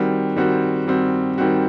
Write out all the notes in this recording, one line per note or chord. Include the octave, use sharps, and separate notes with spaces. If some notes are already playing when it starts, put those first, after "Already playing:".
Already playing: D#3 G3 C4 F#4
D#3 G3 C4 F#4
D#3 G3 C4 F#4
D#3 G3 C4 F#4